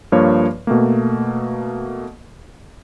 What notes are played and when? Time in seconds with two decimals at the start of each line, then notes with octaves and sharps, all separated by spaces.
0.12 G2 F3 A#3 C#5
0.67 B2 A3 A#3